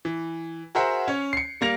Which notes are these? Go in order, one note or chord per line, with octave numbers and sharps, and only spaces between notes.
E3
F#4 G#4 A#4 C5 E5 F#5
C#4 C#5
C7 C#7
G3 A#3 A#6 F7